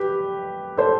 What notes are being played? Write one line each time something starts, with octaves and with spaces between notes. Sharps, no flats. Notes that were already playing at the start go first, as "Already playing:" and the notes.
Already playing: G4 B4
A4 C5